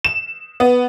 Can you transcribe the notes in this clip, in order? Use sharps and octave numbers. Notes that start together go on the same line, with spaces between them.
E7
B3